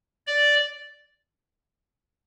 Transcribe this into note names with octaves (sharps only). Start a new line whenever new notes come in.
D5